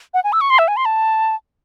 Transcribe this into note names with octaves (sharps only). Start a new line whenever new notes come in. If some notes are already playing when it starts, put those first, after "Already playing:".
F#5
G#5
E6
C#6
C6
E5
G#5
C6
A5